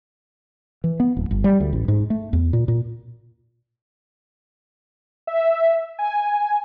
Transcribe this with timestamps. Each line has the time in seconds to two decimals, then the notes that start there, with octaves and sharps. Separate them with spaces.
0.84 E3
1.00 B3
1.17 D1
1.31 G1
1.44 G3
1.60 D2
1.73 A1
1.88 G#2
2.10 A3
2.33 E2
2.53 A#2
2.68 A#2
5.27 E5
5.99 G#5